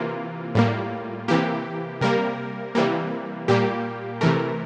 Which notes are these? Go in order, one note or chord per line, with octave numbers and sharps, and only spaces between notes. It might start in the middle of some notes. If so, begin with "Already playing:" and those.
Already playing: C3 E3 A#3 F4
A2 G3 A#3
C3 E3 A#3 G4
C3 G3 A#3 A#4
C3 E3 G3 A#3
A#2 G3 A#3 G4
C3 E3 A3 A#4